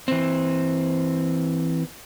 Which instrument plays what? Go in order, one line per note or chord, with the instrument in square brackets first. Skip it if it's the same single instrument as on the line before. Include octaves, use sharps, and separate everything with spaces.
[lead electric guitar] E3 C4